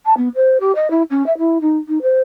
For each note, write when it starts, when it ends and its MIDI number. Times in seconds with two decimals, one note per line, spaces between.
0.06 0.16 81
0.17 0.28 59
0.35 0.60 72
0.60 0.72 67
0.75 0.90 75
0.91 1.03 64
1.10 1.26 61
1.26 1.37 76
1.38 1.58 64
1.61 1.78 63
1.88 2.02 63
2.02 2.21 72